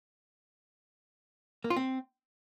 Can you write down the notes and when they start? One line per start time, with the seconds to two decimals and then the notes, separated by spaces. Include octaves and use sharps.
1.64 A#3
1.70 F4
1.76 C4